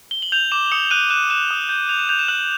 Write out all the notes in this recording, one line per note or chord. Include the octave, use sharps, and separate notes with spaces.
G7
F#7
G6 F7
D6 E7
D#6 C#7
F#6 D#7
F#6 E7
F#6 E7
D#6
G6
G6 F7
E7
G6 F7
E7
F#6 F#7